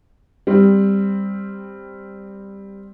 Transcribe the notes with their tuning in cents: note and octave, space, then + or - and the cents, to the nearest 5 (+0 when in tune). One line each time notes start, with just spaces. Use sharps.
G3 +10 C4 +0